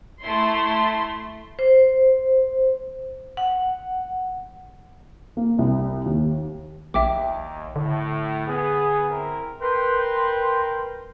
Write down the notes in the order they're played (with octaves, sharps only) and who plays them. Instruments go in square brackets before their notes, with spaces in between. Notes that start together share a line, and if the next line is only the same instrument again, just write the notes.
[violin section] A3 E4 C6
[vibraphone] C5
F#5
[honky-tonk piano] A#3
C2
D#2
[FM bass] A#1 [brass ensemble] D#2 [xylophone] E5 G5 D6
[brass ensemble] A2 [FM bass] D3
[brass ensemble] B3 G#4
C4 E4 A#4
[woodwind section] A#4 B4 G5 C6